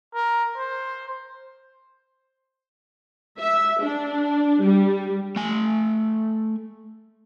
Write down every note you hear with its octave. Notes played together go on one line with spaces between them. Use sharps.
A#4
C5
E5
D4
G3
A3 G#5